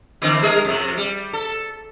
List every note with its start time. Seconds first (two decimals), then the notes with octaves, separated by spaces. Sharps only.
0.22 D3 E3 C4
0.42 G3 G#4 A#4
0.64 F2 C3
0.97 G3
1.33 A4